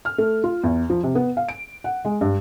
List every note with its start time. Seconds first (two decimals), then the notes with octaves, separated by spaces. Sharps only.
0.05 F6
0.18 A3
0.44 F4
0.63 E2
0.90 F3
1.03 C3
1.15 B3
1.37 F5
1.49 D7
1.84 F#5
2.05 G#3
2.21 G2